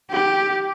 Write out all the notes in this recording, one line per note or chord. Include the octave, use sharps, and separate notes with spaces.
G4